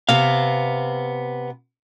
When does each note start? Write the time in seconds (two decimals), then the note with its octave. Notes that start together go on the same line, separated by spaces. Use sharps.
0.09 C3 B3 F5